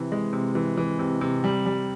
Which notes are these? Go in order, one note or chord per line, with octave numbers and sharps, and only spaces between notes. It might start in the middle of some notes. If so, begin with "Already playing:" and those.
Already playing: C3 E3
G#3
C3
E3
E3
C3
C3
G3
G3